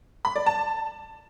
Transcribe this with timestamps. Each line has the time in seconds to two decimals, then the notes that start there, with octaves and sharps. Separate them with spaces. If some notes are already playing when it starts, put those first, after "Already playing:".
0.25 B5
0.36 D5
0.46 A5